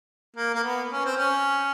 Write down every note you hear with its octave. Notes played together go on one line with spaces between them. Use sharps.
A#3
A#3
B3
C#4
C4
C#4